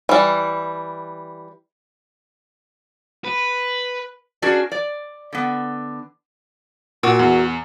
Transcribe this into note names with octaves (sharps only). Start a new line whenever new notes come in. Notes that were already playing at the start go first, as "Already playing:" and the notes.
E3 G3
B4
C#4 D4 F#4 G#4 A#4 D5
D5
D3 B3
A#2 F#4 A#4 E6
E2